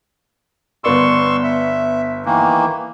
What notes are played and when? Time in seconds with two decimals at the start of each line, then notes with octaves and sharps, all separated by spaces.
0.84 G1 B3 D5 C6 C#6 E6
1.44 E5
2.25 D#3 E3 A#3